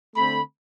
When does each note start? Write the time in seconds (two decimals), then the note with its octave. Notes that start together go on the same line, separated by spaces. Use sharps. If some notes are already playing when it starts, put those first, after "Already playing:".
0.15 D3 A3 C4 B5